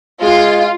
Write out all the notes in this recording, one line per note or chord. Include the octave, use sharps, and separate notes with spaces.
G#3 F4